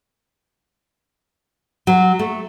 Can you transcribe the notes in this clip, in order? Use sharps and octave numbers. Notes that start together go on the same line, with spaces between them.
F#3
A3